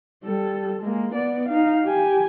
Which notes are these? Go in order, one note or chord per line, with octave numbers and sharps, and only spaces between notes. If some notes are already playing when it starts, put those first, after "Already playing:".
G3 A4
G#3 A#3
B3 D5
D#4 F5
G4 G#5